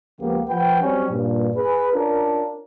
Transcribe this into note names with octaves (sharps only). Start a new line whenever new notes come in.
C#2 C#3 F3 A#3 B3 G4
F3 B4 F#5 G5
F#3 G3 C4 C#4
G2 A#2
G#4 B4
C#4 D4 F4 A#4